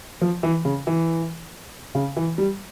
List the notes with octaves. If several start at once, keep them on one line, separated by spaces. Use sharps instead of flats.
F3
E3
C#3
E3
C#3
E3
G3